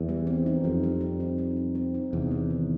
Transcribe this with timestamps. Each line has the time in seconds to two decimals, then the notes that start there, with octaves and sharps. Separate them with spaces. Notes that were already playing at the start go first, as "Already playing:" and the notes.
Already playing: E2
0.09 G3
0.27 C4
0.46 D#4
0.64 F2 G3
0.83 G3
1.01 C4
1.20 D#4
1.38 G3
1.57 G3
1.75 C4
1.94 D#4
2.13 E2 C3
2.31 B3
2.50 D#3